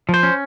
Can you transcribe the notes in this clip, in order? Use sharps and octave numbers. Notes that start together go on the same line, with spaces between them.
F3
C5
C#4